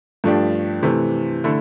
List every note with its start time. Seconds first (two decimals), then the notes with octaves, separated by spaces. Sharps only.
0.24 G2 F3 A3 D4 G4
0.83 C3 E3 A3
1.44 D3 A3 E4